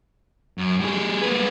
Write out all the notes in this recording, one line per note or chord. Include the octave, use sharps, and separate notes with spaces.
F#2
G3 G#4
A#3 B4